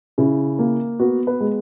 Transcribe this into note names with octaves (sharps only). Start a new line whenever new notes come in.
C#3 E4
A#3
B3 F#4
B4
G#3